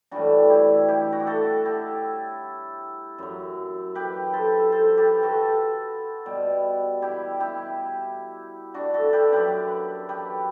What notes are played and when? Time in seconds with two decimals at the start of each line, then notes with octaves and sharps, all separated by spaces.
0.11 A2 E3 G3 D4 F#4
0.50 E4 G4
0.88 E4 G4
1.12 F#4
1.20 G4
1.27 F#4 A4
1.65 E4 G4
3.18 F#2 F#3
3.95 G4 B4
4.33 A4 C5
4.72 A4 C5
4.97 G4 B4
5.23 F#4 A4
6.26 B2 G3
7.02 E4 G4
7.40 E4 G4
8.74 D4 F#4
8.94 F#4 A4
9.13 G4 B4
9.32 F#2 F#3 G4 B4
10.09 G4 B4